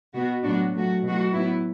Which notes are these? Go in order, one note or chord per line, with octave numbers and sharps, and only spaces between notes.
B2 B3 F#4
A2 F#3 B3 D4 F#4
F#3 A3 F#4
B2 F#3 A3 F#4
A2 F#3 B3 E4